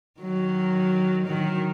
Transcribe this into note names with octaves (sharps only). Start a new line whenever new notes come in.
D#3 F#3
D#3 F#3